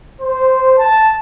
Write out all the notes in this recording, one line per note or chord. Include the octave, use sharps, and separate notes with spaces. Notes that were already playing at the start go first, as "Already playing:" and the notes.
C5
A5